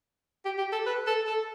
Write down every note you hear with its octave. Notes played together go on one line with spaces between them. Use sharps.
G4
G4
A4
B4
A4
A4